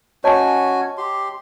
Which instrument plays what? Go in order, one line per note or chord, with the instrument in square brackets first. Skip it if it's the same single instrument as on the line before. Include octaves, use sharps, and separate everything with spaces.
[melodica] C#4 F#4 G#5 [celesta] C#5 D#5 A5
[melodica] G4 C6